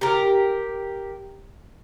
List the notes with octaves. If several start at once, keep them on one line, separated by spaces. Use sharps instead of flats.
G4 A#4